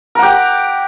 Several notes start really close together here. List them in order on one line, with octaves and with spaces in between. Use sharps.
A#4 F#5 G4